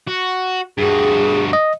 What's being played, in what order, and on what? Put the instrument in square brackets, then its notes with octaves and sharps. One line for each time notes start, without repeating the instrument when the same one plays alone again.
[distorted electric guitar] F#4
[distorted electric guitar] G2 F#4 [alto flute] G#4
[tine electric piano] D#5